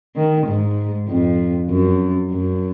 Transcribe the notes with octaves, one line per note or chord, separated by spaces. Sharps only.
D#3
G#2
F2
F#2
F#2